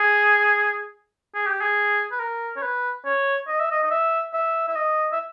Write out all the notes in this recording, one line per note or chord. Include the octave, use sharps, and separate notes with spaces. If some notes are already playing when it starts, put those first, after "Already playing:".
Already playing: G#4
G#4
G4
G#4
B4
A#4
C#5
B4
C#5
D#5
E5
D#5
D#5
E5
E5
E5
D#5
E5